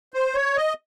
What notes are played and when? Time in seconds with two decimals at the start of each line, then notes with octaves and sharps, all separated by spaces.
0.14 C5
0.35 C#5
0.56 D#5